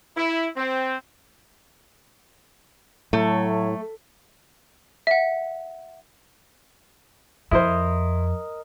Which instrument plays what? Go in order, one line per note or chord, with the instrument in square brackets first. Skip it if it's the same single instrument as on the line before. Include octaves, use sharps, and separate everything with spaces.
[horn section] E4
C4
[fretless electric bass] A2 [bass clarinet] F#3 [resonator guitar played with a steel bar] A3
[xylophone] E5 F#5
[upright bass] F2 [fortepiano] E4 C5 [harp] A#4 D#5